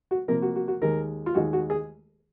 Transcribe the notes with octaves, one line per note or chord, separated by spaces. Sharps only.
F#4
C3 F3 A#3 A#4
F#4
F#4
F#4
D#2 D#3 G#3 A#4
F4
D#2 D#3 G#3 F#4
F#4
G#4